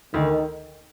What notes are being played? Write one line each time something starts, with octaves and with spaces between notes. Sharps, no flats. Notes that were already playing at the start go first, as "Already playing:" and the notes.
D2 D#3